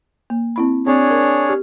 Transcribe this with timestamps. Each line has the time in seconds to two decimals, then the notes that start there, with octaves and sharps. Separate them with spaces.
0.30 A#3
0.56 C4 E4 B5
0.87 C4 D4 G#4 C#5
1.11 A#4
1.49 G4